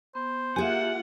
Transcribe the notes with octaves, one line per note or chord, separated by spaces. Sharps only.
B3 C5
A#3 F4 G4 G#4 E5 F#5 G#5